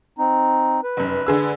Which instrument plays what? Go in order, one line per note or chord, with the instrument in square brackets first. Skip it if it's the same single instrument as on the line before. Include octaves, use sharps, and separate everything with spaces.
[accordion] C4 D#4
B4
[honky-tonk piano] F1 F#2
D3 G#4 E6